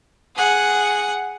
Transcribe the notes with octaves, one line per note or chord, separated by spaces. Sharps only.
G#4 F#5